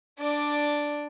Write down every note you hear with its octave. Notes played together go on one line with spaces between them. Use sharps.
D4 D5